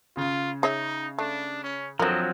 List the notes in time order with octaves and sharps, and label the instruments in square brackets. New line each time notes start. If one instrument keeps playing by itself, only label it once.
[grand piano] C#3 [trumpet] F4
[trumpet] D#4 [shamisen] G#4 C#5 E5
[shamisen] A3 [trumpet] D4
[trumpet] C#4
[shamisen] D3 A#4 [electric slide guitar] F3 F#3 C4 [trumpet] D#5